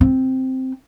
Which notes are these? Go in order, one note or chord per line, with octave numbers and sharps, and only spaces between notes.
C4